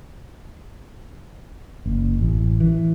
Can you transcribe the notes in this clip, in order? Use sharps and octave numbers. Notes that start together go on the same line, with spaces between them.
F#1
A1
E3